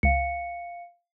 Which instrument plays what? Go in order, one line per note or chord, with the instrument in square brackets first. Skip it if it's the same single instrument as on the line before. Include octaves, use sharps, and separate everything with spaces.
[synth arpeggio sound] C#2 [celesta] F5 C#7